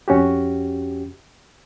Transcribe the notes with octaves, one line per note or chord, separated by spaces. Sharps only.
F2 C#4 F#4 G4